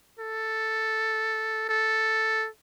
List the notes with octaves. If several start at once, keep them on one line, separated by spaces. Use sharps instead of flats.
A4
A4